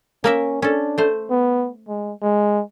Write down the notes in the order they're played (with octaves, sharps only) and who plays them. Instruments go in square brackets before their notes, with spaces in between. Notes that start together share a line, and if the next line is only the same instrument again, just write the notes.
[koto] A#3 A#4 E5 [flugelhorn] C#4
[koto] C#4 A4 [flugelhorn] D4
[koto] A3 C5
[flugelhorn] B3
G#3
G#3